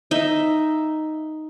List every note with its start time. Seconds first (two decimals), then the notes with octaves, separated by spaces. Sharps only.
0.11 D#4 E5